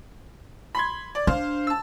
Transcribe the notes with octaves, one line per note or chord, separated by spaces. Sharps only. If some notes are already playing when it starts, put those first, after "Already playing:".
B5 C6 G#6
D5
D4 C5 F5
A5 E6